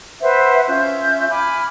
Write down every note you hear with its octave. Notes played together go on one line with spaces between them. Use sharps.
B4 C5 E5 F#5
C#4 F4 E5 G6
G#5 B5 D6 F6